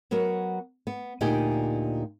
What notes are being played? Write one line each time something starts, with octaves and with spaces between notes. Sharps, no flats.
F#3 B3 F#4 A#4
B3
D2 A#2 D#4 G4 G5 G#5